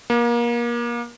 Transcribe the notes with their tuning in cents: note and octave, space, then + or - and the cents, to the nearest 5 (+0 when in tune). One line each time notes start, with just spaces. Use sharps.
A#3 +30